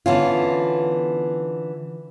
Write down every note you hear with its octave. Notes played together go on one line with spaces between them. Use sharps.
D3 E3 B3 C#4 F4